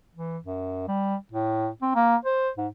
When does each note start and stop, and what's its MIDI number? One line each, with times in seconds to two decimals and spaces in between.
0.15 0.38 52
0.44 0.86 42
0.88 1.15 55
1.32 1.68 45
1.82 1.90 60
1.95 2.16 58
2.25 2.50 72
2.58 2.67 44